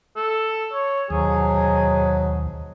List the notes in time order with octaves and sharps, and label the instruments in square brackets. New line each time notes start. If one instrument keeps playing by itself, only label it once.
[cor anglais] A4
C#5
[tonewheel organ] D#2 [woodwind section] G#2 B2 F#3 [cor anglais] G#4